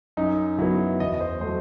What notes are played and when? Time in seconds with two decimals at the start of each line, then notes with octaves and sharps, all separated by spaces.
0.17 F#2 D#4
0.58 F#3 B3 E4
1.00 E2 D#5
1.14 D#5
1.20 C5
1.41 F#3 A3 C5